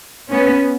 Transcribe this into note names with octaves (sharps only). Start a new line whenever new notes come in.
B3 C#4